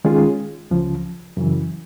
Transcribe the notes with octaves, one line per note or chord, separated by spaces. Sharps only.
D#3 G#3 C#4 F4 G#4
C#2 C#3 F3
F#2 C#3 E3